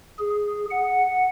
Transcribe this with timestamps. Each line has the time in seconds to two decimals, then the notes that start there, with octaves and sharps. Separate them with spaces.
0.19 G#4
0.71 F#5